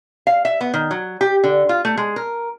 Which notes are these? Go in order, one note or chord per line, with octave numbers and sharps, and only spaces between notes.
F5
E5
B3
D#3
F#3
G4
D3
F4
A3
G#3
A#4